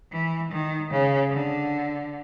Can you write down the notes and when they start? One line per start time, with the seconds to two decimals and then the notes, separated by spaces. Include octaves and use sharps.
0.12 E3
0.52 D#3
0.91 C#3
1.32 D3